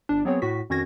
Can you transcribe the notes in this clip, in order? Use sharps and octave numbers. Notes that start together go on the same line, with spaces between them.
G1 D4
F#3 B3 C4 G#4 C#5
A2 F#4 B6
F2 D#3 C#4 F#4 G#6 A#6